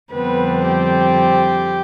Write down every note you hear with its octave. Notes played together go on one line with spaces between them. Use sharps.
F2 D3 G3 B3 C4 B4
G4